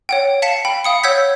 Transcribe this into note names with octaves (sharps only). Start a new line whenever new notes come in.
C#5 F#5 G5
F5 A5 B6 C#7 E7
G5 B5
F5 D#6 C#7
C#5 F#5 E6 G6 G#6 B6